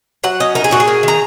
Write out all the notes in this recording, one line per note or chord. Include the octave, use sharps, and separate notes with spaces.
F#3 F#5
C#4 D#5
D#4 A#4
G#4
A#2 F#4
G#4
A#3
D#3 A#5